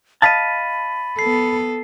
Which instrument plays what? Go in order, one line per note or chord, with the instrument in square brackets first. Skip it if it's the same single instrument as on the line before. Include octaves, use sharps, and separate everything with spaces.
[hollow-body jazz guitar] D#5 F5 A5 [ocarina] B5 [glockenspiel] A6 B6 D#7
[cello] B3 A4 [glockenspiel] C7